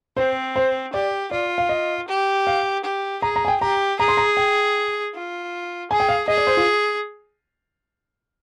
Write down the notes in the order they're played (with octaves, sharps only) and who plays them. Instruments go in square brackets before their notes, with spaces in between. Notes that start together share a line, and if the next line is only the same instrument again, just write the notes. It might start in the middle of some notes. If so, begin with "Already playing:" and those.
[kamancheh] C4 [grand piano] C5
[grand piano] C5
[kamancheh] G4 [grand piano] D5
[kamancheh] F4 [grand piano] D5
[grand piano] F5
D#5
[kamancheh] G4
[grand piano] F5
[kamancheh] G4
[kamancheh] G#4 [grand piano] A#5
[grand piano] A#5
G#5
G5
[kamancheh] G4 [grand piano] A#5
[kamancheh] G#4 [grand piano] A#5
[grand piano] C6
A#5
G5
[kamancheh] F4
[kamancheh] G#4 [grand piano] G#5
[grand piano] G5
F5
[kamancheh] G#4 [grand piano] D#5
[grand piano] D5
C5
F4